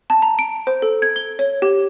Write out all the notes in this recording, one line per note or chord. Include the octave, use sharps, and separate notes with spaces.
A5
A#5
D7
C5
A4
G#6
G7
C#5
G4